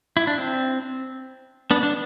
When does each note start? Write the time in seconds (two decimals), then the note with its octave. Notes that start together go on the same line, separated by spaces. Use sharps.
0.17 E4
0.27 D4
0.38 C4
1.71 B3 D4
1.83 D4